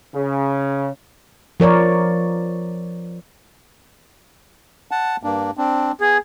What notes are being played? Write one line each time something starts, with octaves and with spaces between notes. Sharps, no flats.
C#3
F3 A#4 C#5 D5
F#5 A5
G2 A#3 D4
C4 D4
B3 G#4